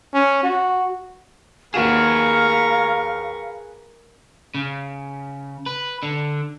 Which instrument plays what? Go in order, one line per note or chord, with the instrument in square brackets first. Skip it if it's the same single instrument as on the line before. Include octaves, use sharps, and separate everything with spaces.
[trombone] C#4
F#4
[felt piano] D#2 F#4 E7 [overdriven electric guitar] G#4 B4 [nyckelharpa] A#4 C#6 [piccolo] F5
[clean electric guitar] C#3
B4
D3